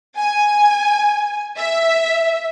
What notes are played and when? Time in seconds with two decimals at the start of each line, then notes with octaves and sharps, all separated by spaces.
0.16 G#5
1.57 E5